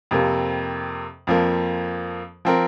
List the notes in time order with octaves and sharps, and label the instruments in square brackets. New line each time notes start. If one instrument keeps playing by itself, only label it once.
[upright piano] F2 C3 A#3
F2 F3 A#3
F3 C4 A#4